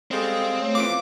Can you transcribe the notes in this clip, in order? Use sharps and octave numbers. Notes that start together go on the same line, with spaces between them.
G3 G#3 C4 A4 F5 D#6
A3 C#5
F2 E3 F3 F5 D6